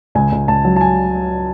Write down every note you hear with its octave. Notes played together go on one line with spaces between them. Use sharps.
C#2 G#5
C#2
C#2 A5
F#3
A5
G#5